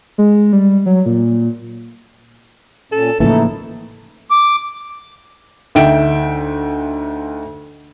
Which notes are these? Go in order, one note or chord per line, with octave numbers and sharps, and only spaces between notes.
G#3
G3
F#3
A#2
A#2 C#4 A4
A2 C#3 E3 F3 A#3 D#4 E4 A4
D6
D2 D#4 E5 G5 D7